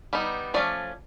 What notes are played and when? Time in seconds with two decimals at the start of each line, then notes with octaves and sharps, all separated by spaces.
0.13 G3 B3 D#4
0.54 F3 A3 C#4 D5